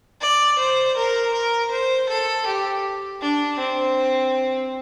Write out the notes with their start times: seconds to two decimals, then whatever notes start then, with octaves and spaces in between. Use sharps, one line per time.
0.21 D5
0.59 C5
0.97 A#4
1.34 A#4
1.71 C5
2.09 A4
2.46 G4
3.21 D4
3.59 C4